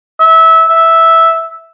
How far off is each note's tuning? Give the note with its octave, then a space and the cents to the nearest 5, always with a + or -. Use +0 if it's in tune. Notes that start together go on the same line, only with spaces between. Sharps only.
E5 -20
E5 -5